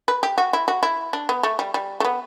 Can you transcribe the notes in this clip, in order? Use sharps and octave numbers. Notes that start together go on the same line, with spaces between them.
B4
G4
F#4
E4
F#4
E4
D4
B3
A3
G3
G3
A3
B3